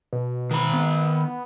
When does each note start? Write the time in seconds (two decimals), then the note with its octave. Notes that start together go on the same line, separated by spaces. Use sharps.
0.13 B2
0.51 D#3 B5
0.73 B3